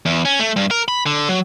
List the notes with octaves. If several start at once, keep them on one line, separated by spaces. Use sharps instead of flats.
E2
C#4
A3
G2
A#4
B5
D3
F#3